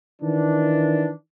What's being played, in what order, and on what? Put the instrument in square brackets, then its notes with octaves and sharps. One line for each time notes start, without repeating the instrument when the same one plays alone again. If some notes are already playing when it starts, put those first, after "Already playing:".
[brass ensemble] D#3 E3 D4